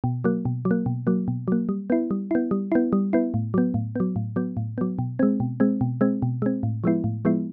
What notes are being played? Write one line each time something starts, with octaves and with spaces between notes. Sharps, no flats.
B2
F#3 A#3
B2
F#3
A#3
B2
F#3 A#3
B2
F#3 A#3
G3
B3 E4
G3
B3 E4
G3
B3 E4
G3
B3 E4
A2
F#3 B3
A2
F#3 B3
A2
F#3 B3
A2
F#3 B3
B2
G#3 C4
B2
G#3 C4
B2
G#3 C4
B2
G#3 C4
A2
F3 G#3 B3 E4
A2
F3 G#3 B3 E4